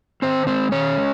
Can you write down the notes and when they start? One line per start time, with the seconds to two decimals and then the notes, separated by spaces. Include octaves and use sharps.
0.22 D#3 C4 C5
0.47 G#3 C4 C5
0.72 D#3 C#4 C#5
0.97 G#3